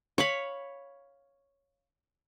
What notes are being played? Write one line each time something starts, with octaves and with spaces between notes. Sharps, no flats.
C#5 F5 B5